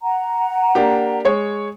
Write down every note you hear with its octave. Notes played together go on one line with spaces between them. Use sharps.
F#5 A#5
A#3 D4 G4
G#3 C#5